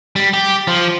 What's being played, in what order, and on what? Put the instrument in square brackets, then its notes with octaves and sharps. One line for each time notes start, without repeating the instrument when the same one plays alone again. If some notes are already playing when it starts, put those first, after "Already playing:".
[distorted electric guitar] G3
G4
F3